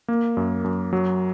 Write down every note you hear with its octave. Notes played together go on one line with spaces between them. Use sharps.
A#3
F#2
F#2
F#3